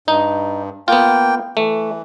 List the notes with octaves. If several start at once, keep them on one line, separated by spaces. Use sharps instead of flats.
G2 D#4
A#3 B3 F4 G5
E3 A3